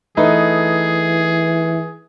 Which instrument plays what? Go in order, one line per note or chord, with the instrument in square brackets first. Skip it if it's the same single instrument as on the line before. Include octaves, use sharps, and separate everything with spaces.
[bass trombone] E3 [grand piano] A3 D#4 B4 [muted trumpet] G#4